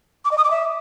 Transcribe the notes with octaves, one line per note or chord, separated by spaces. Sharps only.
D6
D#5
D#6
D6
E5